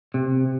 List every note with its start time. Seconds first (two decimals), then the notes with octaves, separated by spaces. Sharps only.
0.14 C3